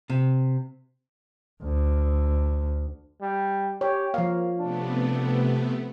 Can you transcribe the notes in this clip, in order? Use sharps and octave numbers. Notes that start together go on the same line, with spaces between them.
C3
D2
G3
G4 C#5
F3 A#3 F5
C3 A3 B3 D4